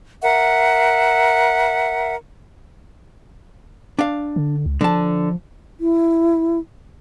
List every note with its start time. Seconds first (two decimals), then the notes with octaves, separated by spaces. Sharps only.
0.22 A#4 E5 F#5
3.99 D4 F5
4.36 D3
4.66 C#2
4.81 D3 F3 A5
5.80 E4